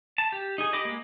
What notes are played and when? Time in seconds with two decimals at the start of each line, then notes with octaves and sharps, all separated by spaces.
0.18 A5
0.32 G4
0.58 D#4 G#4
0.73 G4 D#5 B5 D6
0.85 G#3 A#3